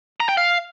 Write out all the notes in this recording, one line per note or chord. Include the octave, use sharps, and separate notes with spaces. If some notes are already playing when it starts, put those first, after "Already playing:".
A#5
G5
F5